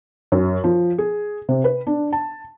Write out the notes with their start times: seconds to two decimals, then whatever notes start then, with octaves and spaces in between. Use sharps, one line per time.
0.32 F#2
0.64 F3
0.98 G#4
1.49 C3
1.64 B4
1.87 D4
2.13 A5